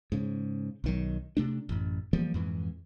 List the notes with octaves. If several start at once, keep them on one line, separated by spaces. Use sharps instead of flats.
G#2 C#3
B1 D#3 F#3
C3 A3 D4
A1 F#2
E3 F3 G3 A#3
F2 G#2 E3